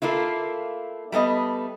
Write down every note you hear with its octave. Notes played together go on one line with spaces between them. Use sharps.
A3 A#3 E4 F4
G3 A3 B3 D#5